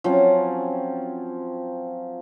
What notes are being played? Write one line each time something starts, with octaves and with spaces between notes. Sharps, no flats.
F3 F#3 C4 C#4